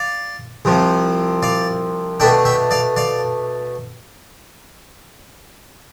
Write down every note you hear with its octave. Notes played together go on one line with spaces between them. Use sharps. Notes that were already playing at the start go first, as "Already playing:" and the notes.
Already playing: D5 F5
C2 C3 F3
D5 F5
B2 A3 D4 E5 G5
E5 G5
D5 F5
D5 F5